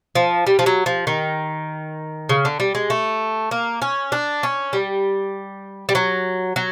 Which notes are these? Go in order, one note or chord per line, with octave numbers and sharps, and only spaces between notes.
F3
G3
F3
F#3
F3
D#3
C#3
D3
G3
G#3
A3
A#3
C#4
D4
C#4
G3
G3
F#3
F#3